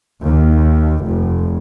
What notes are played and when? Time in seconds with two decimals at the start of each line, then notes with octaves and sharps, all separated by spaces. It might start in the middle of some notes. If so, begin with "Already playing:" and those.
0.24 D#2
1.04 F1